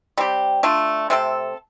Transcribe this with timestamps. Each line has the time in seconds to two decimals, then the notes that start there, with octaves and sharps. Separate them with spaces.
0.18 G3 C4 G4
0.63 A3 D4 F4
1.10 C3 A3 C4 A4